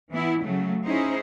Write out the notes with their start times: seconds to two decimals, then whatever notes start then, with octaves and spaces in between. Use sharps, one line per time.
0.11 E3 B3 E4
0.44 C#3 F#3 A3
0.87 C#4 D#4 E4 G#4 C5